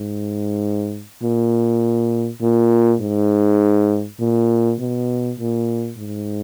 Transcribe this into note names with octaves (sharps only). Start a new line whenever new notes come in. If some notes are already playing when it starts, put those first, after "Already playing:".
Already playing: G#2
A#2
A#2
G#2
A#2
B2
A#2
G#2